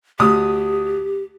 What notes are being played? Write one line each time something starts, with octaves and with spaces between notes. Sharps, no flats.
D2 G4 D#6